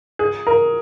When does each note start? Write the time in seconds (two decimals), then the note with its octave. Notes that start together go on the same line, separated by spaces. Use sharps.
0.19 G#4
0.47 A#4